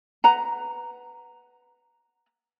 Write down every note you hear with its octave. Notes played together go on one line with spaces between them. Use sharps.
B4 F#5 A#5